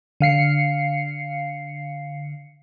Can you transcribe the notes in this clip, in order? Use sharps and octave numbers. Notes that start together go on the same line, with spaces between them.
D3 F5 C7 C#7